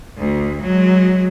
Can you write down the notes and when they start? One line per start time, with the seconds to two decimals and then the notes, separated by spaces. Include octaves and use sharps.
0.18 D2
0.62 F#3 G#3